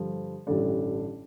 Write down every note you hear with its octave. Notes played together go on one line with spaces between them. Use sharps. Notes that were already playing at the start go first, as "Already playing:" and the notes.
Already playing: G2 D3 F3
A1 G2 D3 A3 D4